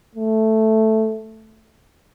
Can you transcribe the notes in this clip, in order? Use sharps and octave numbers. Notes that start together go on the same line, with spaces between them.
A3